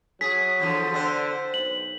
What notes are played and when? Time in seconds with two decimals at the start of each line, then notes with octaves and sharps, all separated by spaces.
0.21 F#3 G#4 B6
0.59 E2 D3 F3
0.94 D3 C4 C5
1.54 B1 F#7